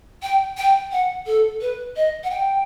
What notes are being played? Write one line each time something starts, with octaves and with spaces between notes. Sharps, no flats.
G5
G5
F#5
A4
B4
D#5
F#5
G5